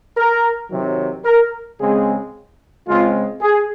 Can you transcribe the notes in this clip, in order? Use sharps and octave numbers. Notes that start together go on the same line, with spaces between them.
A#4
C3 D#3 F#3
A#4
C#3 G#3 C4 G#4
C#3 G#3 C4 F4
G#4